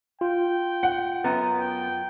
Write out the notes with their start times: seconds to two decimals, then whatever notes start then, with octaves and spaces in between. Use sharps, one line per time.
0.21 F4 G5
0.83 F#5
1.24 F#2 B3
1.60 G5